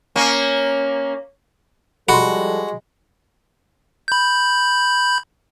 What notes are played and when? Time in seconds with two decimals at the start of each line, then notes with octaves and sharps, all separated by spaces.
0.16 A#3 C#4
2.09 F3 G3 G#3 F#4 A4 B5 C6
4.08 B5 G6